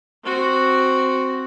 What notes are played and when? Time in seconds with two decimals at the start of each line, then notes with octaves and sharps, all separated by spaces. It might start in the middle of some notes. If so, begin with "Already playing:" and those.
0.24 C4 F#4